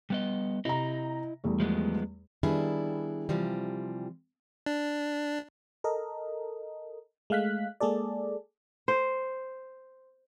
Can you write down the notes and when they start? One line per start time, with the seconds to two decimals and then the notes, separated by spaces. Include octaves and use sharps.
0.10 G3 B3 D#5
0.65 C3 E4 D#5 A#5
1.44 E2 G3 A3
1.60 F3 G#3 B3
2.43 D#3 G3 B3 D4 E4 G#4
3.29 C3 E3 F3 G3
4.66 D4
5.84 A4 A#4 D#5
7.30 G#3 A3 F5 F#6 B6
7.80 G#3 A#3 G#4 A4 D5
8.88 C5